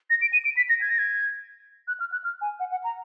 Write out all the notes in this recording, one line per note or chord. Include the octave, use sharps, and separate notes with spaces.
A#6
D7
D#7
D7
B6
A#6
G#6
A#6
G#6
F#6
F6
F#6
F6
G#5
F#5
F#5
A#5